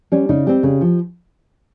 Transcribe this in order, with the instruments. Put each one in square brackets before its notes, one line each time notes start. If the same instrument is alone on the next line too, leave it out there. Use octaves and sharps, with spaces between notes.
[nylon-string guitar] G3 C#4
C#3 D#4
G3 C4 G4
C#3
F3